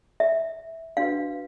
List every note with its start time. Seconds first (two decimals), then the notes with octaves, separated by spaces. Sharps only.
0.20 E5
0.97 D4 F#4 B4 F5